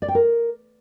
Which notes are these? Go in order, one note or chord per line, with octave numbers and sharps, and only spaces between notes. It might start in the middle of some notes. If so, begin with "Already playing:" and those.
D5
G5
A#4